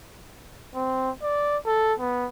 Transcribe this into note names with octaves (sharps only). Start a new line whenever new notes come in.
C4
D5
A4
B3